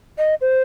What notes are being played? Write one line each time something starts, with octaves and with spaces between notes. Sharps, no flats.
D#5
C5